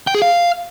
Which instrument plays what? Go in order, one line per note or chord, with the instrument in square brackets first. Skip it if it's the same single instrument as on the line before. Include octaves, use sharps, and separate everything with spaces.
[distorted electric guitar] G5
G#4
F5